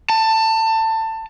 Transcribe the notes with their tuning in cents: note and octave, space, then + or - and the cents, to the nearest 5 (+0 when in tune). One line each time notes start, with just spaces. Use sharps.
A5 +20